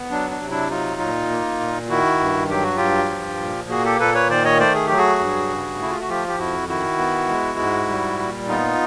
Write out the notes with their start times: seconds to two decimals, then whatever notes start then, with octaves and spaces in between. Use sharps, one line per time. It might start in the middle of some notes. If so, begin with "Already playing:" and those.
Already playing: B3
0.11 F#3 D4
0.31 D4
0.40 C3
0.51 D4 E4
0.70 F#3 D#4 F4
1.01 A#2
1.30 A#3
1.60 A#2
1.90 D#3 E4 F#4
2.20 G2
2.49 F#3 G4
2.63 F#4
2.77 G2 F4 G4
3.10 F3
3.40 A#2
3.70 A#3 F#4 G#4
3.84 G4 A4
4.00 A#2 A4 B4
4.14 B4 C#5
4.29 D#3 C5 D5
4.44 C#5 D#5
4.59 A3 C5 D5
4.75 G#4
4.87 F#3 G4
4.97 F#4 G#4
5.19 G2
5.49 C#3
5.79 A3 E4
5.90 F4
6.00 F#4
6.09 F3 F4 G4
6.28 G4
6.39 F2 E4 F#4
6.69 D#3 E4 F#4
6.99 B3
7.29 G#3
7.58 G#2
7.89 G3
8.19 A#2
8.48 B3 D#4 F4